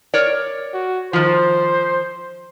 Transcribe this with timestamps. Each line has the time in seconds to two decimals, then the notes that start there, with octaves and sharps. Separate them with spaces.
0.14 A#4 C#5 D5
0.74 F#4
1.13 D#3 F3 C5